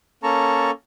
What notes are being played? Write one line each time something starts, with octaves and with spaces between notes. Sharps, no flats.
A#3 C#4 A4 A5 A#5 C#6